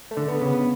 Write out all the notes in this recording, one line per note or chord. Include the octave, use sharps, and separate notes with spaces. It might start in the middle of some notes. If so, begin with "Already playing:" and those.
A3
D3
B3
C#3
B3